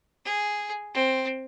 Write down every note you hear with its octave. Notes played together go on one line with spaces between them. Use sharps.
G#4
C4